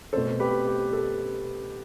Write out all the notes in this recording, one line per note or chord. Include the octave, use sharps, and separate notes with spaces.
B2 A3 C4 A4 C5
G4 B4
G4
A4